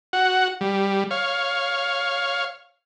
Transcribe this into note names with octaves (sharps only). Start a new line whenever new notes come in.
F#4 F#5
G3
C#5 F5